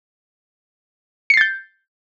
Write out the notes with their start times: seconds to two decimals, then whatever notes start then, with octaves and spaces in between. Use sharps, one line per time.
1.30 C#7
1.34 C7
1.37 A6
1.41 G6